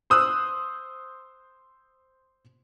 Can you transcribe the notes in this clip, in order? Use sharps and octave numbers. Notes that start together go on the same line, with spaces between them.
C5 D#6 E6 F#6